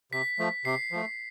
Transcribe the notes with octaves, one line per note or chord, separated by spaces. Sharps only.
C3 B6
F3 A3
C3 C7
F3 A3